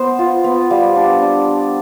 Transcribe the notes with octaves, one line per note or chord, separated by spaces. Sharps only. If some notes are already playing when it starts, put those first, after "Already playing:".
Already playing: B3 C5
F4
B3
G3 F5
D4 D5
D4
D4